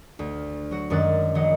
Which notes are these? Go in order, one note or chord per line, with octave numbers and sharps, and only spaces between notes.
D2
F#3 F#4
F#2 D#3 G#3 D5 F#6 A6
A#1 D#3 D#5 F#5